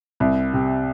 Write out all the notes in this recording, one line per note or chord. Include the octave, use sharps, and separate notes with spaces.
C2
C3